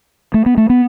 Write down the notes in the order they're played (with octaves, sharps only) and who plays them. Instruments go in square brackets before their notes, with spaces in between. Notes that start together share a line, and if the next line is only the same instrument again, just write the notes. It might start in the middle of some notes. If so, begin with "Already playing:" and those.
[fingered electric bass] A3
B3
A3
B3